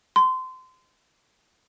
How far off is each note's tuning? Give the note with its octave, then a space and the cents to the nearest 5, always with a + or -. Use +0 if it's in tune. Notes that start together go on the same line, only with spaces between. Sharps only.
C6 -25